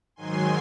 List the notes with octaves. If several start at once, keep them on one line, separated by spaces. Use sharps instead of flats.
G#2 D#3 F#3 G#5 C6